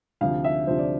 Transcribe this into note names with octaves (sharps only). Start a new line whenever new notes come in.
D2 C3 F3 F5
E5
D2 C3 F3 C5
D5